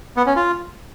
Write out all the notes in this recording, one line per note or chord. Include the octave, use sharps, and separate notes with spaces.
B3
C#4
F4